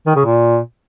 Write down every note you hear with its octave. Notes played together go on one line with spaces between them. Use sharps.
D#3
C#3
A#2